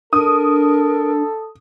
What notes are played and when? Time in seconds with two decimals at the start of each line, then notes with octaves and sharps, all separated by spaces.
0.13 D4 A4 A#4 D#6